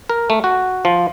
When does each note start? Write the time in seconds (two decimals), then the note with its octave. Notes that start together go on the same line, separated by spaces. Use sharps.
0.09 A#4
0.30 A3
0.44 F#4
0.85 F3